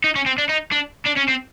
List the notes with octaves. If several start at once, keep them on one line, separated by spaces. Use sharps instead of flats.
D#4
C#4
C4
D4
D#4
D4
D4
C#4
C4